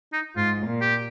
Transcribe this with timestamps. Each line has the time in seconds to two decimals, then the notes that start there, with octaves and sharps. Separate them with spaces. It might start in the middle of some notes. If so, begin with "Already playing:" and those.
0.13 D#4
0.36 G#2 F4
0.67 A#2
0.81 G4